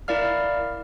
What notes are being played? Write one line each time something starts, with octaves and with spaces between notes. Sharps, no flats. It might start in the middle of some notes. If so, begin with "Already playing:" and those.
E4 A#4 D5 F5 F6